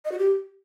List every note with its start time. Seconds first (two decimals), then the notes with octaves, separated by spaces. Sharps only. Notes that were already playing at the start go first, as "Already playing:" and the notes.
0.05 D#5
0.12 F#4
0.18 G4